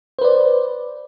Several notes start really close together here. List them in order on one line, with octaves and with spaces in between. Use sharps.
C5 B4 D5